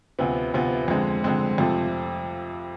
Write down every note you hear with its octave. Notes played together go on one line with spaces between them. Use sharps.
D2 C3 F3 B3
D2 C3 F3 B3
F2 D3 G#3 C4
F2 D3 G#3 C4
F2 C3 F3 A3